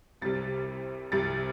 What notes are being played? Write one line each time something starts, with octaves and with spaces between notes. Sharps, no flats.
C2 C3 G3 A6
C2 C3 G3 A6